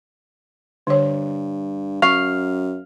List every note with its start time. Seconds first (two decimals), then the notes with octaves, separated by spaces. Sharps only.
0.87 G2 D3 C#5
2.02 F#2 F5 C#6